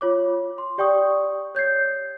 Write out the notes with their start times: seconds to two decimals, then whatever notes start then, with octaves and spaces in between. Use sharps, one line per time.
0.01 F4 C#5 D6
0.58 C6
0.78 G4 D5 G5 C#6 D#6
1.55 C#5 G6 G#6 C7